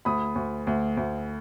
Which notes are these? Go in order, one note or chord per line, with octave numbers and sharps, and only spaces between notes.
D2 B5 D#6
D2
D2
D2